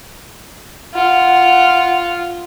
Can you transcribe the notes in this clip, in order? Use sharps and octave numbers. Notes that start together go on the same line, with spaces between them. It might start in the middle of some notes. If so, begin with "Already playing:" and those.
F4 F#5